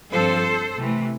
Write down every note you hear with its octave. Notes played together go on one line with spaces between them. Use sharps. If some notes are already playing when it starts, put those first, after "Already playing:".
G2 F3 C4 A4 C5
C3 E3 A3